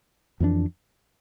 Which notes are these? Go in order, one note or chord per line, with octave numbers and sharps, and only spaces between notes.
F2 E3 A#3 D4